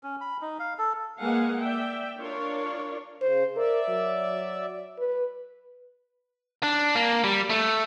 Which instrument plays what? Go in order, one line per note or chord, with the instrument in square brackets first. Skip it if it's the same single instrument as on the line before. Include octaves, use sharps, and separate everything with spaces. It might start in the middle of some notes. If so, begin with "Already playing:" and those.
[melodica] C#4
B5
D#4
F5
A4
[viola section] G#3 A#3 B4 F5 F#5 G#5
D5 E5 G5
D4 F4 A#4 C#5 D5
[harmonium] C#3 [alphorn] C5
[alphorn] A#4 [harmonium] D5 E5
[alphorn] F#3
B4
[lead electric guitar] D4
A#3
G3
A3